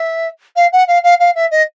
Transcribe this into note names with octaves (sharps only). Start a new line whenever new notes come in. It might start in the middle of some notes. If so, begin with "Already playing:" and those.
Already playing: E5
F5
F#5
F5
F5
F5
E5
D#5